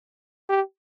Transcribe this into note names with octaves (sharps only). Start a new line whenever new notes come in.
G4